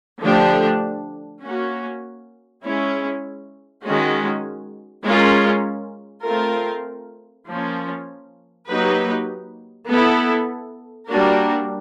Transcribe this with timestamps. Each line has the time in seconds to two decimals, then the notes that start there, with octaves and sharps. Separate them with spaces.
0.21 D3 F3 A3 D4 G4
1.42 A#3 C#4 F#4
2.63 G#3 C#4 E4
3.84 D#3 G#3 C#4 F#4
5.05 G#3 C#4 F4 A#4
6.26 A3 C4 F4 A#4
7.47 F3 A#3 C#4
8.67 F#3 A#3 D#4 G4 B4
9.88 B3 E4 A4
11.09 G3 A#3 D4 F#4 A#4